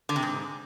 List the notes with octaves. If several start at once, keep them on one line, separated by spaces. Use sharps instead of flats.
D3
C3
G#2